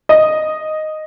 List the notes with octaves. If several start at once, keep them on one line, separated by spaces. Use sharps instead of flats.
D#5